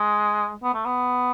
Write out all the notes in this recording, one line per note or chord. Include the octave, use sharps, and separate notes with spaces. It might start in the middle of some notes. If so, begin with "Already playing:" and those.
Already playing: G#3
B3
A3
B3